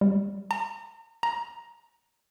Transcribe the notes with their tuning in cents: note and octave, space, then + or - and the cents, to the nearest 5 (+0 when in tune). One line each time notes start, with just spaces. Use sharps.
G3 +35
A#5 -35
A#5 +15